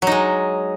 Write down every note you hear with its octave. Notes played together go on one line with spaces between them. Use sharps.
F#3 G#3 D#4